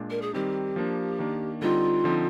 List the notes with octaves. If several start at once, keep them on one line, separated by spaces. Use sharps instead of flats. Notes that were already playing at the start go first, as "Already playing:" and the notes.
Already playing: A#2 G#3 D4
A#4
G#4
D#3 G3 C4 D#4 G4
F3 A#3 D4
D#3 A#3 D4
D3 G3 C4 D#4 F4
D3 F3 C4 D#4